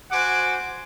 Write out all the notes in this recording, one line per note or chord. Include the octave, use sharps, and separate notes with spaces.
F#4 C5 F#5 G#5 D6